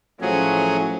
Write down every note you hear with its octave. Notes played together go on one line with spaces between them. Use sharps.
A1 F3 F#3 A3 C#4 G#4